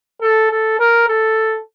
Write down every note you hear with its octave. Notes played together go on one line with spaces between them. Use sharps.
A4
A4
A#4
A4